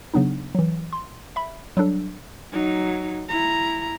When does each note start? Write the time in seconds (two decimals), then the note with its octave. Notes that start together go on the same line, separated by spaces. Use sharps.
0.14 C#3 F#3 B3 D4 D#4
0.55 E3 F#3
0.93 C6
1.36 E5 B5
1.77 F#3 G3 D4 A4
2.53 F#3 D#4
3.29 E4 A#5